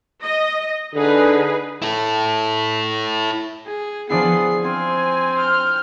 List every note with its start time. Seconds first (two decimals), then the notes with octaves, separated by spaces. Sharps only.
0.22 D#5
0.94 D3 D#4 G#4 B4
1.82 E4 A4
3.67 G#4
4.10 F3 B3 D4 E4 G#4 C7
4.65 C4 F4 G#5
5.38 F6 G6